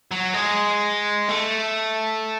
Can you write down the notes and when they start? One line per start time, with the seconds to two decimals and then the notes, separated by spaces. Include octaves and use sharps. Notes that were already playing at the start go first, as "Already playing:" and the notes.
0.12 F#3
0.34 G#3
1.29 A3